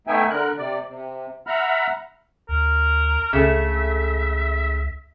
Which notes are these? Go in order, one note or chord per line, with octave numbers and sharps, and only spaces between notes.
A3 B3 D#4 E5 G5 G#5
D3 A#4 F#6
C3 D5
C3
E5 F#5 A#5 B5 F6
D2 A#4
C#2 C#3 A3 E5